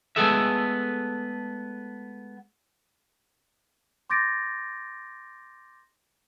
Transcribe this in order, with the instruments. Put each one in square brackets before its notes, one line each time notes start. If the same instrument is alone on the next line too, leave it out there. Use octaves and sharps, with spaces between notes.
[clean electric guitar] G#3 A3 B3 G#4 A4 E5
[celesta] C6 D6 G6 A6 A#6 D7